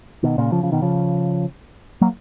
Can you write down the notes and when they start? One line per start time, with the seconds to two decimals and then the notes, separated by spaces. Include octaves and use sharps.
0.23 B2 D#3
0.38 A#2 C#3
0.52 C#3 F3
0.63 C#3 F3
0.72 B2 D#3
0.82 C#3 F3
2.01 F#3 A#3